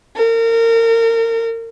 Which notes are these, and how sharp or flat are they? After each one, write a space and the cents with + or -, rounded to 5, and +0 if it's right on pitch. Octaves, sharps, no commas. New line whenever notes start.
A#4 -30